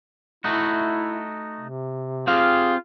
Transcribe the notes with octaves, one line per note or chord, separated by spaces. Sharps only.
A3 D#4 E4 F#4
C3
C4 F4 G4 G#4 F5